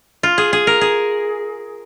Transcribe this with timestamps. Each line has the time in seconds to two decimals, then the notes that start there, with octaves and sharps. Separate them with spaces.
0.23 F4
0.38 G#4
0.53 G#4
0.67 A#4
0.81 G#4